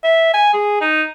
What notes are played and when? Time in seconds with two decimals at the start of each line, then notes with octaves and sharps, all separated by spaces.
0.04 E5
0.34 G#5
0.54 G#4
0.81 D#4